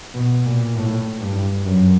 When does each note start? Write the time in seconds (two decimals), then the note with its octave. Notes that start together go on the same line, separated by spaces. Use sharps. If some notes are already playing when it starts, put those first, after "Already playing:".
0.14 B2
0.45 A#2
0.75 A2
1.20 G2
1.65 F#2